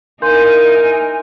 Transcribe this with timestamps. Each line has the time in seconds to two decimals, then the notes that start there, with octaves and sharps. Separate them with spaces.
0.22 A#3 D#4 E4 A#4 G#5 C6 G6